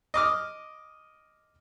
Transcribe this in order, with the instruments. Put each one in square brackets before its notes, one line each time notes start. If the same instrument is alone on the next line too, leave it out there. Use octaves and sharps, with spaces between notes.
[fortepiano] D#5 D6 F6